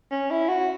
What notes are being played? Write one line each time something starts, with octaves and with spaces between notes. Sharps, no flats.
C#4
E4
F#4